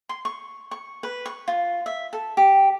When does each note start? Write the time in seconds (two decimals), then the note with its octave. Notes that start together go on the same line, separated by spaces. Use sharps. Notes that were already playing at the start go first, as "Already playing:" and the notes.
0.09 C6
0.25 C#6
0.71 C#6
1.03 B4
1.26 C#6
1.48 F4
1.86 E5
2.13 A4
2.37 G4